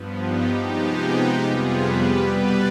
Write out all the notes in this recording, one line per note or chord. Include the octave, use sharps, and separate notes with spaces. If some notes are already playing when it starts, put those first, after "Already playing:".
Already playing: G2 F3 B3
D#4 G4
C3 F3 G#3 B3 D#4 G4
F2 C3 G3 B3 F4 G#4
G4 B4
B2 G3 B3 B4 D5